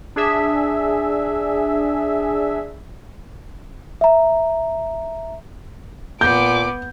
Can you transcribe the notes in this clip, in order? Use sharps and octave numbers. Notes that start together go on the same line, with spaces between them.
D4 G#4 E5
E5 A#5
A#2 B3 D6 G6